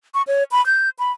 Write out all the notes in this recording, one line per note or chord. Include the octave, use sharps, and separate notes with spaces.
C#6
C#5
B5
G6
B5